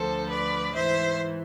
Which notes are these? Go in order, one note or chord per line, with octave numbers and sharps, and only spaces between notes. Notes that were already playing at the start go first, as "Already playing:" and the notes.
Already playing: D2 D3 F3 A4 C5
B4 D5
G#2 E3 C5 E5